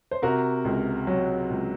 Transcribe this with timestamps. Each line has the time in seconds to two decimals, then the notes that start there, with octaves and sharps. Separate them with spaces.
0.11 C5
0.22 C3 F#4 A#4
0.65 C#2
1.07 F#3
1.50 C#2